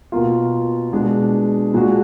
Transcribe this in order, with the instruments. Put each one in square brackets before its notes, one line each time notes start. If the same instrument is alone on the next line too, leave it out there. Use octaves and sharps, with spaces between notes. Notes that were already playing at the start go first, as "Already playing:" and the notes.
[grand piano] B2 A#3 F4
B2 G#3 D4
A#2 G#3 D4 F#4